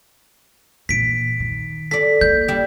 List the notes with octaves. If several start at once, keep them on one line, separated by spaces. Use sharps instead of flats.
A#2 E3 B6 D7
D#3
A4 D5 B6
A#3 G6
G3 D5 E5